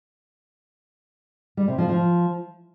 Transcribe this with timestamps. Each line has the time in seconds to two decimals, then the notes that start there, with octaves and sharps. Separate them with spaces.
1.57 G3
1.68 C3
1.78 F3
1.89 F3